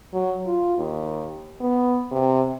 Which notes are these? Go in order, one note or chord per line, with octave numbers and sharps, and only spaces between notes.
F#3
F4
D#2
B3
C3